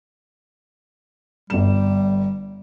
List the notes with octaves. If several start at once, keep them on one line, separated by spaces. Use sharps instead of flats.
G1 G3 E7